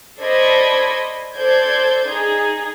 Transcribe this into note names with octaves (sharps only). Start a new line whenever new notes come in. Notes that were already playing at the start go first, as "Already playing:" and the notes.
A4 C5 D5 D#5 B5 G#6
A4 C5 D5 G6 G#6
D#4 G#4